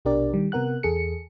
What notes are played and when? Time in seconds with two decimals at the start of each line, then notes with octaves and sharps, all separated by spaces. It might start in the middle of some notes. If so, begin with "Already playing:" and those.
0.05 A#1 B2 D4 G4 A#4 D5
0.34 D#3 G3
0.52 C3 B3 A#4 F#5 F#6
0.83 E2 G#4 A4 C#7